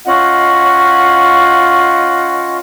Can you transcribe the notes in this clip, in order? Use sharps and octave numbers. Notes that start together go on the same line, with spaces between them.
C#4 F4 D#5 F#5